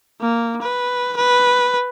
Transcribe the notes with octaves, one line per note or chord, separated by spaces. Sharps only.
A#3
B4
B4